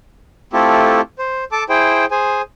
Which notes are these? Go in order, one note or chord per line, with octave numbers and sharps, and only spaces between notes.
A3 C4 E4 F4 G4 A4
C5
A4 A5 D6
E4 G#4 C5 G5
G#4 C5 G#5